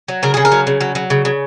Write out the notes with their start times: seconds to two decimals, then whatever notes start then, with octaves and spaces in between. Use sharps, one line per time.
0.08 F#3
0.23 C#3 A#4
0.34 C#3 G#4
0.45 A#4
0.52 F#3
0.67 C#3
0.81 F#3
0.95 F#3
1.10 C#3
1.25 C#3